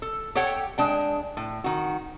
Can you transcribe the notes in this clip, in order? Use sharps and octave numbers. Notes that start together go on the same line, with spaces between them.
A4
G4 A4 C#5 F#5 G5
G#3 D4 G5
A2
D#3 F#4